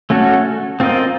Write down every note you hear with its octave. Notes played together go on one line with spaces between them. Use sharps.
A3 C#4 F#4 A4
C4 F4 A#4 D#5